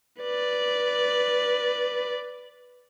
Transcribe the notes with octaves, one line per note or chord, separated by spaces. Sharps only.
B4 D5